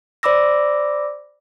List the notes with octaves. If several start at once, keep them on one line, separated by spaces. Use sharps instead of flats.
C5 D5 B5 D6 E6 A#6